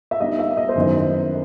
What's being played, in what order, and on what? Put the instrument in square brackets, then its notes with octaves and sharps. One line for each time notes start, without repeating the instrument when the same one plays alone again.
[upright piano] E5
[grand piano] G3 B3 D#4 [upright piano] D#5
[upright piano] E5
D#5
C5
[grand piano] F#2 D#3 F#3 B3 E4 [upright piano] D#5